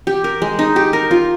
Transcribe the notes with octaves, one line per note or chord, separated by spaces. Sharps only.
G4
A#4
G#3
D#4
G4
A#4
F4